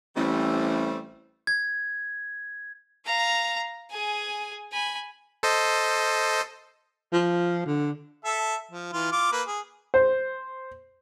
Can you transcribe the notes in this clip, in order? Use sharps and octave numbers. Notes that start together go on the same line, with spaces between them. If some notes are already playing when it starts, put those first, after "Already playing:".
A1 G3 A3 C4
G#6
F5 A#5
G#4 G#5
G#5 B5
A4 C5 D#5
F3
D3
A4 E5
F3
E3 F4
F4 D6
A#3 B4
G#4
C5